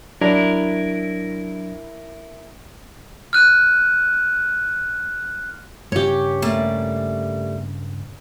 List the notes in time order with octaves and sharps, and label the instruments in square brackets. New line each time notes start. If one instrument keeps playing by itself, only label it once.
[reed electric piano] F#3 D4 [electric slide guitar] E4 A#4
[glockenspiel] F6 F#6 D#7
[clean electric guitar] G2 C#3 [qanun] G4 C#5
[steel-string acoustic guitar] G3 A3 A#3